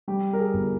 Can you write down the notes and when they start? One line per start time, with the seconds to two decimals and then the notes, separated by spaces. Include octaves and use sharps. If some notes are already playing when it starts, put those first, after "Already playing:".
0.08 G3 G4
0.33 A#4
0.39 G#4
0.54 G1